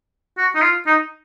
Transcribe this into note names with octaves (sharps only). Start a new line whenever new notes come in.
F#4
D#4
F4
D#4